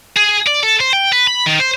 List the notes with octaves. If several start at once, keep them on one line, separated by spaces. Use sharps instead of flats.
G#4
D5
A4
C5
G5
B4
B5
D#3
C5